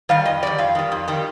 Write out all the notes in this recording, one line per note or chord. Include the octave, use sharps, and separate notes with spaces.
D#3 G3 F5
F2 D#5
D#3 G3 D5
F2 F5
D#3 G3
F2
D#3 G3